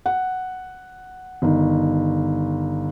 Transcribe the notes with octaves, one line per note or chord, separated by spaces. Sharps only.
F#5
G1 D#3